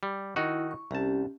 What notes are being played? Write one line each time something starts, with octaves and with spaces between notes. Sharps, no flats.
G3
D#3 D#4 E4 F#4
C#6
C2 C#4 G4 A5